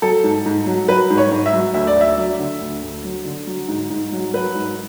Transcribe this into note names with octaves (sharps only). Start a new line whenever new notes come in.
F#3 A4
G#2
G#2
F#3
F#3 B4
G#2
C#5
G#2
E5
F#3
D2 E5
D5
D2
E5
F#3
D3
D2
D2
F#3
D3
F#3
G#2
G#2
F#3
F#3 B4
G#2